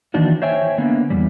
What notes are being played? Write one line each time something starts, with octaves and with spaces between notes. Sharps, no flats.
D#3 E3 A#3 D4 D#4 F#4
C5 C#5 E5 G5 G#5
D3 A#3 B3
E2 C3 G3